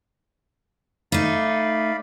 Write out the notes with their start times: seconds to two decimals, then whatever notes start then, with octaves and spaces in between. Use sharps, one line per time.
1.12 A3 D#4 D5 F5 B5